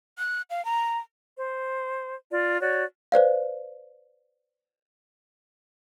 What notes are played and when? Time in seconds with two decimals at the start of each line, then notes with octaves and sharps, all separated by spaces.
0.18 F#6
0.50 F5
0.65 A#5
1.37 C5
2.31 F4 D5
2.61 F#4 C#5 D5
3.12 B4 C5 D5 F5